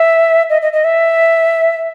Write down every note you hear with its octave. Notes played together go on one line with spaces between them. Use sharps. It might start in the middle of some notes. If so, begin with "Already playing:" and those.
Already playing: E5
D#5
D#5
D#5
E5